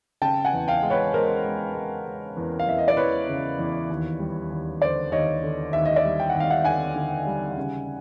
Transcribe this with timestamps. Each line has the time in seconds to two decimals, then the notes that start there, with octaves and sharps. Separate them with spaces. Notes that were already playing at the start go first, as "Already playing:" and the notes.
0.22 C#3 G5 A5
0.45 F#5 G#5
0.53 E2
0.68 F5 G5
0.83 G#3
0.90 B4 C#5
1.13 G#3 A#4 C5
1.44 G#3
1.75 G#3
2.06 G#3
2.37 E2
2.59 F5
2.68 E2 E5
2.78 D#5
2.88 D5
2.97 E3 B4 C#5
3.29 C#3
3.59 E2
3.90 D#2
4.20 G3
4.50 D#2
4.81 D3 C5 D5
5.12 D#2 C#5 D#5
5.43 D3
5.73 D#2 E5
5.85 D#5
5.96 D5 E5
6.04 G3
6.20 G5
6.30 D#2 F#5
6.40 F5
6.50 E5 F#5
6.64 D3 F#5 G#5
6.95 D3
7.27 G3
7.57 C#3